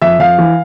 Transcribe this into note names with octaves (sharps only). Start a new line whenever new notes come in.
F2 E5
F2 F5
E3